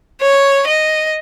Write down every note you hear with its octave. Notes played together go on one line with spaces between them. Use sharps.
C#5
D#5